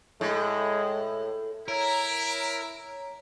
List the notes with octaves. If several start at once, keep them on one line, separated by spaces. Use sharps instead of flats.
A2 G#3
E4 A#4 C#5 A#5